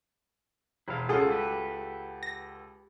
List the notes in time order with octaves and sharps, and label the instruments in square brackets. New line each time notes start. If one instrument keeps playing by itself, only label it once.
[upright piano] E1 [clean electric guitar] E4 F5
[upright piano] C#2 F#4 A4 [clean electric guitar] C#4 F4 [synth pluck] G#4
[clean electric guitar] G4 B4
[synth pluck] A#6